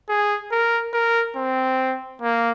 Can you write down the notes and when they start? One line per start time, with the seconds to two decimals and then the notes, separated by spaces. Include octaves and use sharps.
0.08 G#4
0.51 A#4
0.93 A#4
1.36 C4
2.22 A#3